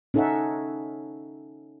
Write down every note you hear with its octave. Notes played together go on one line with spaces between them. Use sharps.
C#4 D#4 A4 C#5 E5 F#5